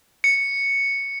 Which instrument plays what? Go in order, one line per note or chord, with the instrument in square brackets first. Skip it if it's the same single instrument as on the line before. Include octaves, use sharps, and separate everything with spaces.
[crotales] C#7